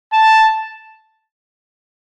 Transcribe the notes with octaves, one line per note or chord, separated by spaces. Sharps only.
A5